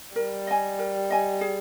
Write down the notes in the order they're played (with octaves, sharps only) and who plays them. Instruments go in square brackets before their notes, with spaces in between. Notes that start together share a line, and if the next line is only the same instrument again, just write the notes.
[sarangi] G3 [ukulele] A#4
[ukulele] D#5 G#5
A#4
D#5 G#5
G#4